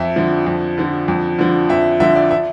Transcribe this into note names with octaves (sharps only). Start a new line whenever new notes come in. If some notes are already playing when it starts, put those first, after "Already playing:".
Already playing: F2 E5
D3 F3
F2
D3 F3
F2
D3 F3
F2 E5
D3 F3 E5
D5
E5